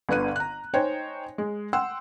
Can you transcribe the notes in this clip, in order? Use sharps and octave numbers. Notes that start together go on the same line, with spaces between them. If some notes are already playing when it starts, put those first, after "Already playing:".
G1 D3 B3 F#6 D#7
A#5 F#6
D#4 C5 C#5 G5 G#5
G#3
F#5 G5 C6 E6